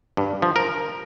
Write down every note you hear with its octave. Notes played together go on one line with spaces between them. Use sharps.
G2
F3
A#4